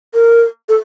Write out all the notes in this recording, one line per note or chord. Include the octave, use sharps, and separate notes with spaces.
A#4
A4